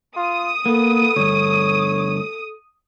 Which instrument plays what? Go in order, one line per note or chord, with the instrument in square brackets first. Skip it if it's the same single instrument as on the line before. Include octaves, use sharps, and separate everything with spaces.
[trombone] F4 [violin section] D#6
[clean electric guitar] A#3 [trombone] B3 [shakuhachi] A4
[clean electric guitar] D2 G2 [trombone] C#5